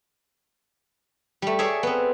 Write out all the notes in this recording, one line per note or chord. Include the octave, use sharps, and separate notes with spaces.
G3 A3
G#4 A4 C#5 D5 E5
B3 C4